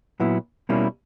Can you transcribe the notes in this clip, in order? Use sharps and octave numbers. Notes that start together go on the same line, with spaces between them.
A#2 F#3 B3 E4
B2 G3 A#3 C#4 E4